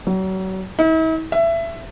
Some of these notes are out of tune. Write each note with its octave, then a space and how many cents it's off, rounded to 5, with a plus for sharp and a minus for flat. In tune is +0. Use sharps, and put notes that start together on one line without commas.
F#3 +35
E4 -45
E5 +20